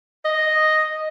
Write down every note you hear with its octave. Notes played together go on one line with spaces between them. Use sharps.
D#5